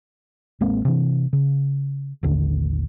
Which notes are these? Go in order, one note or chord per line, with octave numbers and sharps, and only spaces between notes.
A1 G#3 A#3 C4
C3 E3
C#3
A1 D#2 D3